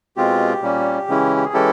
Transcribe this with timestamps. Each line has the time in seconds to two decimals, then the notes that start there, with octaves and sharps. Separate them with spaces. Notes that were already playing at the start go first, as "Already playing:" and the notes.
0.17 B2 G#3 C4 F4 G4
0.62 A#2 G3 A#3 C#4
1.08 C#3 E3 G#3 C#4 E4
1.36 G4
1.45 G#4
1.54 E3 G#3 C#4 E4 G4 A4